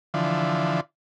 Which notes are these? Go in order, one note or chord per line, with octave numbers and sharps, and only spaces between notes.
D3 E3 F3